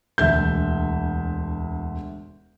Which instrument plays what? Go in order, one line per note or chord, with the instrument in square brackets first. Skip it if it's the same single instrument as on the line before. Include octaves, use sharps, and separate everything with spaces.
[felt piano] E1 D2 E5 G6